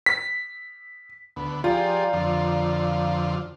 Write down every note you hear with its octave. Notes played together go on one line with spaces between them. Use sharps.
B6
D2 B3
F3 F4 G4 G#4 D5 A#5
F2 D3 F3